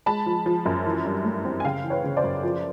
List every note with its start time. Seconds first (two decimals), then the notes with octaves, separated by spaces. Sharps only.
0.06 G#3 A5 B5
0.26 F3
0.46 F3
0.66 F#2
0.86 E3
1.05 G2
1.24 A3
1.45 C4
1.60 G#5
1.64 C#3 F5 G5
1.84 E3
1.90 B4 C#5
2.04 C#3
2.17 C5 D5
2.24 F#2
2.43 F3